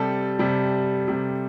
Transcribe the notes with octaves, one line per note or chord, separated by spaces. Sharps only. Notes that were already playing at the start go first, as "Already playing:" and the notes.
Already playing: C3 G3 A4
C3 G3
C3 G3